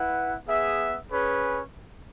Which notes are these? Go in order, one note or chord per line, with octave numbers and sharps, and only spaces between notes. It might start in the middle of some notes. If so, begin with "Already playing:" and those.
Already playing: E4 B4 F#5
B3 G#4 E5
C#4 G#4 B4